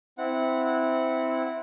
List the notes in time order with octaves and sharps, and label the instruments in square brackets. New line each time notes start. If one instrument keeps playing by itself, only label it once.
[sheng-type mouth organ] C4 E4 F#5